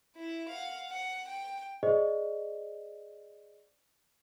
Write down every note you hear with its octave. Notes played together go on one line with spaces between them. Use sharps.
E4
F5 F#5
F#5
G5
G#4 C5 D5 D#5